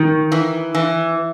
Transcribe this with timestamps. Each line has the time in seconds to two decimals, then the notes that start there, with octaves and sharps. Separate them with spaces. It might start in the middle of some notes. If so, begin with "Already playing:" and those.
Already playing: D#3
0.32 E3
0.75 E3